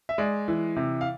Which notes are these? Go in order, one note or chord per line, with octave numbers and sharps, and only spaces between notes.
E5
G#3 D5
E3
C3
F5